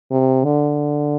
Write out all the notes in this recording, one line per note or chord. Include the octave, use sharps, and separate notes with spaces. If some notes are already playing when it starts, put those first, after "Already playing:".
C3
D3